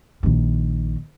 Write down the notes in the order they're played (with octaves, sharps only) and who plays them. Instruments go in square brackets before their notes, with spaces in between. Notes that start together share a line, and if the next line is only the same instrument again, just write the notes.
[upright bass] A#1 D#3